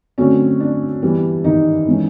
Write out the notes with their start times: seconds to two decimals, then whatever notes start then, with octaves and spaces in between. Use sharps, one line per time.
0.18 D3 F#3 A3 C4 C#4
0.60 D4
1.02 E3 G3 B3
1.44 D#3 D#4
1.87 E3 G#3 C#4